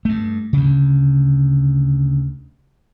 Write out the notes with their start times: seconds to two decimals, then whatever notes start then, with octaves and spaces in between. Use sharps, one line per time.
0.05 G2 A3
0.53 D2 C#3